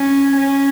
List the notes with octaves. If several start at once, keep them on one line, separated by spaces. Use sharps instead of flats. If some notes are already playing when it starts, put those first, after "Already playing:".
Already playing: C#4
C#4